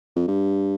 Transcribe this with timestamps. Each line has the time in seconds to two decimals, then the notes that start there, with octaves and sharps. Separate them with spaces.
0.16 F2
0.28 G2